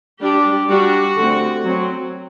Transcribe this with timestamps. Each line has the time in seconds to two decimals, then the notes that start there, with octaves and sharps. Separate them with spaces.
0.21 G3 D4 G4
0.69 G3 D4 F#4
1.16 D3 A3 C4
1.65 F#3 C4